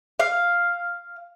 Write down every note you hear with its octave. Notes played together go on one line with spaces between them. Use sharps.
F5